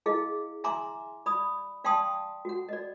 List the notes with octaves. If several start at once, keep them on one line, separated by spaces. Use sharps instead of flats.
E4 G#4 D#5 F5
E5 G#5 A#5 C6 D6
D5 B5 D#6
D5 F5 G5 A5 C6 D#6
F#4 F#5
D5 D#5